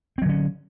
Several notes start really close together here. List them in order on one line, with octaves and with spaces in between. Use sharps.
C4 F#3 D3 C#4